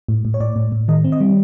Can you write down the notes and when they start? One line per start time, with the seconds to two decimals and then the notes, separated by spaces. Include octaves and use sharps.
0.08 A2
0.25 A2
0.34 C#5
0.40 A2 D5
0.56 A2
0.72 A2
0.88 D#3 D#5
1.04 C4
1.12 D#5
1.20 G3